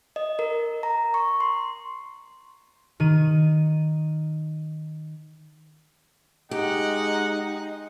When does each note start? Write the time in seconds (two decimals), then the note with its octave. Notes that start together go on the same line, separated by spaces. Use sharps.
0.16 D#5
0.39 A#4
0.83 A#5
1.14 C#6
1.40 C6
3.00 D#3 D#7
6.51 G#3 D#4 G4 F#5